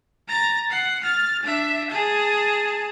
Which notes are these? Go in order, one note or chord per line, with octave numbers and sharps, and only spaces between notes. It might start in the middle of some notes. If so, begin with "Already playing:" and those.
A#5 A6
F#5 C7
F6 A6
D4 E5
G#4 A5